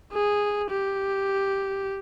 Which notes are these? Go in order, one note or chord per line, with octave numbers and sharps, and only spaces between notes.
G#4
G4